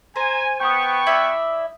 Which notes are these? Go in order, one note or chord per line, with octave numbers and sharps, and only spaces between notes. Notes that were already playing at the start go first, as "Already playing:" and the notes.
C5 G#5 A#5
B3 G5 C#6 D#6 G6
E4 D5 E5